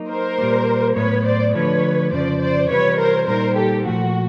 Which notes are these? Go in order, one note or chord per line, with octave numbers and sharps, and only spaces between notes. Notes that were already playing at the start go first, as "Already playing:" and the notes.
Already playing: F#3 A#3 D#4
A#4 C5
A#2 G3 A#3
A2 F#3 B3 B4 C#5
C5 D5
D3 F3 A3 B4 C#5
F2 C#3 F3 C5 D5
C5 D5
C3 E3 G3 C4 F4 B4 C#5
A#4 C5
A#2 G3 A#3 D#4 F#4 A#4 C5
G4 A4
A#2 F3 A3 F#4